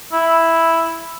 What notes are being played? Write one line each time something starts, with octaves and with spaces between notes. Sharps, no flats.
E4